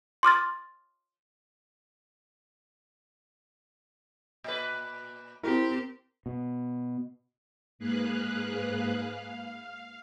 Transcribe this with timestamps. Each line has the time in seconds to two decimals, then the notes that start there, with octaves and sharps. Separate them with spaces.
0.23 C6 D6 F6 A6
4.44 A#2 B4
5.43 C4 E4 G4 A#4
6.26 B2
7.79 G#2 A#3 G#4 B4 F5 F#6
8.93 F5